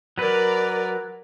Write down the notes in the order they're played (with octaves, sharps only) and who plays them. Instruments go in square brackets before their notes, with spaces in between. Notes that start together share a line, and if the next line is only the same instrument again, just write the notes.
[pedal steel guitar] F#3 B4 [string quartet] A#4 D5 A#5